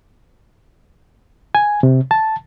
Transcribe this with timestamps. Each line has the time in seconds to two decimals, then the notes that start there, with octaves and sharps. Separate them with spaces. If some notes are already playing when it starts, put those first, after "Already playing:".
1.55 G#5
1.83 C3
2.11 A5